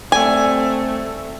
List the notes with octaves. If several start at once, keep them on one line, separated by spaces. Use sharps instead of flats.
G3 A3 C4 G#5